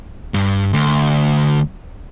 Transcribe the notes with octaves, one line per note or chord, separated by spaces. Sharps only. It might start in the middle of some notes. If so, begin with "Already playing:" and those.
G2
D2